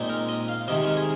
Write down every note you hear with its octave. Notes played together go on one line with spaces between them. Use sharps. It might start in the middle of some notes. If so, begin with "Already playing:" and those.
Already playing: A#2 G#3 C4 D#4
A#4
D#5
F5
C3 D#3 G#3 D#5
A#4
G#4